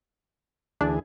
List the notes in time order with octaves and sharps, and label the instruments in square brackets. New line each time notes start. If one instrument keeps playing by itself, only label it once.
[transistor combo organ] D2 E3 G#4 [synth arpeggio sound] D4